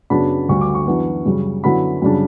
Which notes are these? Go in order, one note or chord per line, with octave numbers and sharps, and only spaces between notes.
F#2 C#3 F#3 B3 D4 B5
D2 D3 G3 C#6
D6
C#6
F#2 E3 B3 D4
F#2 C#3 G3
F#2 D3 F#3 B3 E4 B5
F#2 C#3 G3 D4